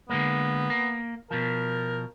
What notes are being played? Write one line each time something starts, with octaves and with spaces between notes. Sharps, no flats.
D3 G#3 A#3 B3
A#3
B2 F3 A#4